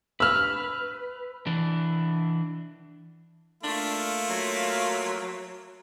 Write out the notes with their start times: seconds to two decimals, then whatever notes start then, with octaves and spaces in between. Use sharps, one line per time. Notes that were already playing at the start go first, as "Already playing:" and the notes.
0.20 B4 E6 F6
1.47 E3 D4
3.63 A3 A#3 D4 F4
4.30 F#3